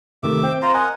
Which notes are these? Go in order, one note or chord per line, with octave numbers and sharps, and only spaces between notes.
C3 D#3 A3 E5 D6
C4 G5
F4 C5 A#5
A#4 D#5 F#5 G#5